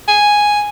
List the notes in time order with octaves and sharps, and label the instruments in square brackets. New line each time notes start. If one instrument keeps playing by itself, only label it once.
[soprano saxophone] G#5